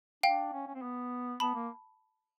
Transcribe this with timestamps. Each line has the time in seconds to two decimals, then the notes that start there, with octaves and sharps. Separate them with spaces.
0.23 D4 F5 G5
0.53 C#4
0.67 C#4
0.75 C4
0.82 B3
1.40 B3 A5 B5
1.54 A#3